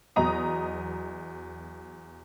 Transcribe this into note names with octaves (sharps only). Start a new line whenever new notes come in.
E2 F#3 D#5 A#5 D#6